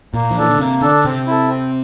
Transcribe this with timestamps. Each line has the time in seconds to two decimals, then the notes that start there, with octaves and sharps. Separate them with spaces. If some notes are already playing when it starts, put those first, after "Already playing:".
0.14 A#2 A#3
0.31 F3
0.36 E3 D4 A4
0.50 D3
0.59 C3 A#3
0.81 D3 D4 A4
1.04 C3 C4
1.27 E4 A4
1.48 C4